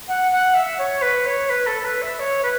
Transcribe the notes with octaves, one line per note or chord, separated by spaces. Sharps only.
F#5
F#5
E5
C#5
B4
C#5
B4
A4
B4
E5
C#5
B4